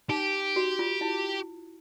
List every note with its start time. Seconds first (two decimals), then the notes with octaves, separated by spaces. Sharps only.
0.09 D#4 G4
0.56 F#4
0.79 F4
1.01 E4